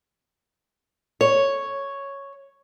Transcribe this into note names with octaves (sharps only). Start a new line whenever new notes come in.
C#5